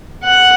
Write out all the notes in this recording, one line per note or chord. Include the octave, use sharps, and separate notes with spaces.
F#5